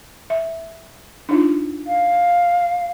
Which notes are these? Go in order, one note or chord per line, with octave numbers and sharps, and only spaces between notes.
E5
D4 D#4 F4
F5